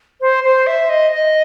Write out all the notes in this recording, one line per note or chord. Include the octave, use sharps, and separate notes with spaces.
C5
C5
E5
D#5
D#5